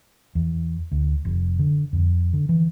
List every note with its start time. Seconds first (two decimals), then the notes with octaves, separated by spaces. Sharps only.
0.35 E2
0.92 D2
1.25 F1
1.59 D3
1.93 F2
2.33 D3
2.49 E3